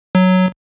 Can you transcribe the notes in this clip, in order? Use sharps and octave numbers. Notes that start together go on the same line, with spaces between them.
F#3